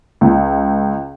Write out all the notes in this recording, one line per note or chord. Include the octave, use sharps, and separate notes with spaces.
C#2